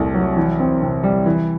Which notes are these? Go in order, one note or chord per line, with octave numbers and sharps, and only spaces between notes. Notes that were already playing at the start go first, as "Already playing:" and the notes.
Already playing: C2 C3 A3
F#3
E3
C4
C3
G3
E3